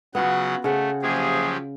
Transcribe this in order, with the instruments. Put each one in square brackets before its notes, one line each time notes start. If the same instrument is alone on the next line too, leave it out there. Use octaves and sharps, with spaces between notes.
[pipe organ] C#3 F#3 F#5 [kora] B3 F4 F#4
[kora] C#3 C5 F#5 [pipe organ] A3
[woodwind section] C3 A#3 G#4 [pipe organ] F3 F#3 G4